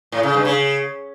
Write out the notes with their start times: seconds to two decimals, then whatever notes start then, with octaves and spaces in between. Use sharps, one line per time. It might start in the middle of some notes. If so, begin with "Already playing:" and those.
0.12 A2
0.23 C#3
0.34 G2
0.45 C#3